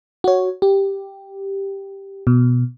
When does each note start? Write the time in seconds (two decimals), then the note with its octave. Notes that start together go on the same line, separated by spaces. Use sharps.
0.24 F#4 C#5
0.62 G4
2.27 B2